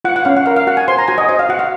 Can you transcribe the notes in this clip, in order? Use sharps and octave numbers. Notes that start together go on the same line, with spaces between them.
F4 F#5
F#5
C#4 F5
F#5
A#4 F5
F5
F#4 F#5
G#5
C5 C6
A#5
F#4 G#5
D#5
C5 D#5
F5
F#4 F#5
F5